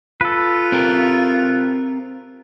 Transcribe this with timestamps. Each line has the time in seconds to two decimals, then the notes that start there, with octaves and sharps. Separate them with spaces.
0.21 F4 A4 B4
0.72 C4 G4 A#4